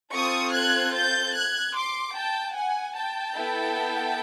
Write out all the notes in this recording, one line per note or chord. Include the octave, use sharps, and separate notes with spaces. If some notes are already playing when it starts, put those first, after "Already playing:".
C4 F4 A4 C#6 D#6
F#6 G#6
G6 A6
F#6 G#6
C6 D6
G5 A5
F#5 G#5
G5 A5
B3 E4 A4